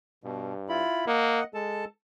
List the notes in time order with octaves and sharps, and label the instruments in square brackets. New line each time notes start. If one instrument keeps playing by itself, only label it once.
[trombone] G2 [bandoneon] B2
[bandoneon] E4 F4 B5
[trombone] A#3 [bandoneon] D#5 F#5
[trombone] G#3 [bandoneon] A4 A5